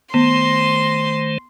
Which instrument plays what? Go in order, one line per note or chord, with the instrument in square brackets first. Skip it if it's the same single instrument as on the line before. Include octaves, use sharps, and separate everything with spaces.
[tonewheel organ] D#3 A3 C5 [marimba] B3 [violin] C6